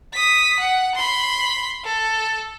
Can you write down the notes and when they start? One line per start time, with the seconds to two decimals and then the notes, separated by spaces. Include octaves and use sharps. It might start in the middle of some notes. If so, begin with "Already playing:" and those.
0.13 D#6 B6
0.60 F#5
0.95 B5 C6
1.84 A4